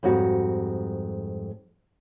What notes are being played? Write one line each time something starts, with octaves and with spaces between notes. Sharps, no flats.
F2 G#2 G3 F#4